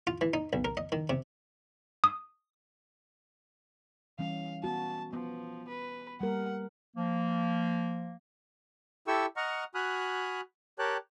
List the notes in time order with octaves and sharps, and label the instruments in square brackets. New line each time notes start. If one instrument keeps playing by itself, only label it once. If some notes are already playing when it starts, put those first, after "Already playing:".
[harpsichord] F4
E3
D#4
B1
A#4
D#5
D#3
C3
[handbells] D#6
[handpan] E3 G3 C#4 [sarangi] F5
[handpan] B3 F#4 [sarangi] A5
[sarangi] F3 [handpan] B3
[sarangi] B4
[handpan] G3 A#3 A#4 [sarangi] F#5
[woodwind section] F3 A#3
[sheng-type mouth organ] E4 G4 A4 G5 C#6 E6
D#5 F#5 A#5 C#6 F6
F#4 G#5 B5 D#6 F6 F#6
G4 A#4 C#5 G5 A5 F#6